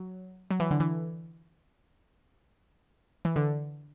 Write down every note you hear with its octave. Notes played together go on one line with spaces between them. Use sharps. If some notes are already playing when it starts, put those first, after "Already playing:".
Already playing: F#3
F#3
E3
D3
E3
E3
D3